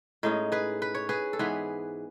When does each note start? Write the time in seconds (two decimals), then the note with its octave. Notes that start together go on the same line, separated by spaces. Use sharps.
0.23 A2 G#3 C#4 D#4
0.52 G#4 B4
0.82 B4
0.95 C#5
1.09 G#4 B4
1.33 A4
1.39 G#2 E3 B3 G#4 B4